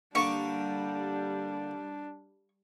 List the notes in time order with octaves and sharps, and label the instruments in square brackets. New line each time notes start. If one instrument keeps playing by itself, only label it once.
[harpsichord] D3 A#3 D6 [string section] G3 [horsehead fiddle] D4 [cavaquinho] C#6